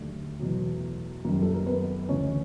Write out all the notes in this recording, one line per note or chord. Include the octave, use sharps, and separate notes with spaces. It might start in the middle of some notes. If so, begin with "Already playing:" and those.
Already playing: D#2 D3 F#3 A3
E2 B2 F#3
F#2 D#3 G3 A#3 A#4
A4
A#4
B3 B4
D2 C#3 E3 C#4 C#5